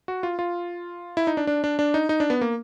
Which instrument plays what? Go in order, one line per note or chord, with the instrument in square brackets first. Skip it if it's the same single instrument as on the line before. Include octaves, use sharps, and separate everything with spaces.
[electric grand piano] F#4
F4
F4
E4
D#4
D4
D4
D4
D4
D#4
D#4
D4
B3
A#3